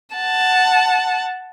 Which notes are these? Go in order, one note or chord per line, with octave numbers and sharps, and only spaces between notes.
F#5 A5